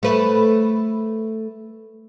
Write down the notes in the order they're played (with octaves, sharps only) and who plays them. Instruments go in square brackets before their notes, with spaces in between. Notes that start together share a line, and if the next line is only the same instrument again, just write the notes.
[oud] A3 B4